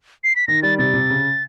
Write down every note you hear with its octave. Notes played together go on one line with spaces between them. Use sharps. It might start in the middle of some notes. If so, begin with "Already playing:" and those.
C7
B6
D#3 A#6
G3 A6
C3 A6
C3
C#3